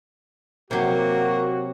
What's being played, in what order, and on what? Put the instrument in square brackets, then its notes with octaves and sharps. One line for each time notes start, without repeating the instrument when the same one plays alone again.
[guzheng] C3 F#3 [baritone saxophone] A#3 [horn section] F#4